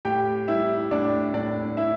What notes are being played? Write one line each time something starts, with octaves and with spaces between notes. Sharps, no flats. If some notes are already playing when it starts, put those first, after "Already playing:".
A2 G4 G5
G3 E4 E5
A2 D4 D5
A2 D4 D5
E4 E5